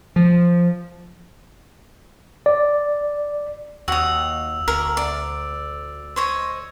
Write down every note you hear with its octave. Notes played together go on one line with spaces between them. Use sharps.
F3
D5
D#2 F#4 D#6 E6 F7
D2 A#4
D5
C5 C#5 D#5